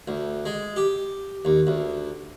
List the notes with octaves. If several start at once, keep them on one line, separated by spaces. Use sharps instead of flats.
D2
G#3
G4
D#2
D2